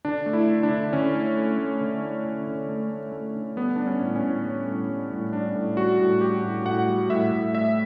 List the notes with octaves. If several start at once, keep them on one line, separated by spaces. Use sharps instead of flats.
D3 D4
A3
E4
D3
D4
D3
D3 C#4
A3
A3
A3
D3
A3
D3
D3
A3
A3
A3
D3
G3 B3
G3 D4
C#4
A2
C#4
A2
G3
A2
G3
A2
G3 D4
A2
G3 F#4
A2
G3 G4
A2
A2 F#5
G3
A2 E5
A2
A3 E5